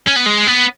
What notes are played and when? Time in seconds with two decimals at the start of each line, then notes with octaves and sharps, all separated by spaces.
0.08 C#4
0.16 B3
0.26 G#3
0.47 B3